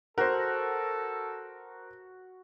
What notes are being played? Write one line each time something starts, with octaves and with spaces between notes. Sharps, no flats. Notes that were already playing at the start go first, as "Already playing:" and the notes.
F#4 A4 A#4 C5